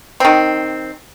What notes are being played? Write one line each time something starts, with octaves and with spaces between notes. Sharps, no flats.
D#3 C4